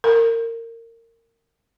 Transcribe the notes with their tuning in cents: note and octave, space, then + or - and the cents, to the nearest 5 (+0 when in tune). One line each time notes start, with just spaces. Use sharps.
A#4 -25